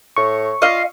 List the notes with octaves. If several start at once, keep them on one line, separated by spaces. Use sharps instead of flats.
A2 C#6
F4 D#5 F5